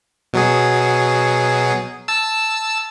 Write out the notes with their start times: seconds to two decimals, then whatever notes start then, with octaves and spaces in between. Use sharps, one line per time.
0.33 B2 F#3 G#4
2.08 A5 E6